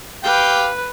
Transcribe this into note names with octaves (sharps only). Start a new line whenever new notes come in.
G4 B4 F5 G5